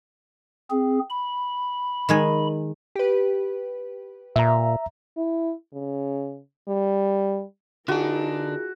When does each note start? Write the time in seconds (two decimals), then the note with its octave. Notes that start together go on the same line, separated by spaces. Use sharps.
0.71 C4 G#4
1.10 B5
2.09 D#3 G#3 G#5
2.95 G4 B4
4.36 A#2 E5 A#5
5.17 E4
5.73 C#3
6.68 G3
7.88 D3 D4 D#4 F4 F#4 G#4 A#4